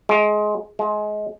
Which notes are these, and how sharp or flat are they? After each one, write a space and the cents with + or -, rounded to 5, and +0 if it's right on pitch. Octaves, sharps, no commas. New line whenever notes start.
G#3 +20
G#3 +25